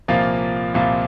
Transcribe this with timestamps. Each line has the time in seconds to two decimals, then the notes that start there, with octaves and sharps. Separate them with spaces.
0.08 C2 A#2 F3 A#3 F4
0.74 C2 A#2 F3 A#3 F4